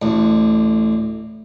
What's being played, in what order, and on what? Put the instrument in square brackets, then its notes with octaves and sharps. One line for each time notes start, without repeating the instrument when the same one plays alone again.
[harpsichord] A1 D2